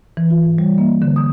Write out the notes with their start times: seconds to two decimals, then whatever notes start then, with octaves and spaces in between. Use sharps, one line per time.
0.17 E3
0.30 F4
0.43 G#2
0.58 G3
0.78 A#3
1.02 D3
1.16 D#6